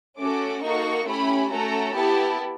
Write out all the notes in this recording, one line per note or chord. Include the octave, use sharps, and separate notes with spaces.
A3 C#4 F#4 A4 D6
A#3 D#4 F#4 A4 C#6
A3 C#4 E4 G4 B5
A3 C#4 F#4 A4 A#5
B3 E4 G4 A5